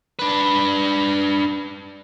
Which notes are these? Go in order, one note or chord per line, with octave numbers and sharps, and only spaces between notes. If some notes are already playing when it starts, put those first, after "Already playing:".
D4 B4